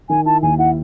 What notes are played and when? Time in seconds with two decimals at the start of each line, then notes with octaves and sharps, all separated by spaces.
0.09 D#3 G#5
0.26 E4 A5
0.43 D#2 G#5
0.59 E4 F#5